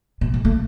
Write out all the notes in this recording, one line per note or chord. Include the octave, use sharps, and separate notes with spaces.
B2
B2
A3